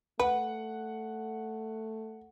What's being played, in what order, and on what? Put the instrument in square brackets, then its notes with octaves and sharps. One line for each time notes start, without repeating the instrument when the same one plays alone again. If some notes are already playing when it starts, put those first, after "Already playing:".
[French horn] A3 [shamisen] B4 [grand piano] F#5